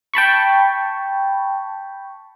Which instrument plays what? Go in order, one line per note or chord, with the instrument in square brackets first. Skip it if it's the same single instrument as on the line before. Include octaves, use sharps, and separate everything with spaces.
[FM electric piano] G5 A5 B5 C#6